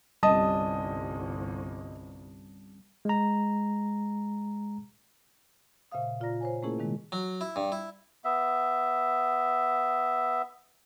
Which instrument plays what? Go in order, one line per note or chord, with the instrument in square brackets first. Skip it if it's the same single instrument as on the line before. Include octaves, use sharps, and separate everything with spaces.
[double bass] G1 C2 [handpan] G3 C4 C#4 [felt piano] D#5 [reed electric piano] A5 D#6
[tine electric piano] G#3 A#5
[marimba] A#2 C#3 C5 E5 F5 D#6
A#2 F4 D5 A#5 A#6
C5 C#5 G#5
A3 A#3 C#4 E4 G#4 A#4
C3 D#3 G#3
[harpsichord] F#3
E4
G2
E4
[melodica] B3 E5